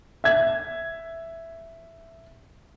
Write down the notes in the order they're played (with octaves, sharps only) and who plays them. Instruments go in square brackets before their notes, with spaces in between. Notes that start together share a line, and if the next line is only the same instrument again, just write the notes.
[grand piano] E5 G#6